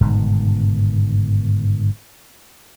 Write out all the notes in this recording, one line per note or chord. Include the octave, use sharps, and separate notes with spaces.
G1 G#2 B2 D#3